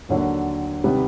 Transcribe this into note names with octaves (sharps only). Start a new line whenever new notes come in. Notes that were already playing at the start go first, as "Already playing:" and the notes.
D#2 D3 F#3
C3 D#3 G3 B3